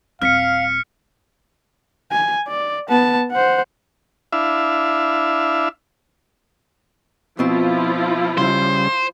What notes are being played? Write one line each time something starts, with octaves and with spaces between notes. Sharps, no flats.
D#1 C4 F5 F6 B6 C#7
G#5
D5
B3 A5
C5 F#5
D4 E4 E5 F5
B2 F3 C4 E4 F4
C#3 G3 C5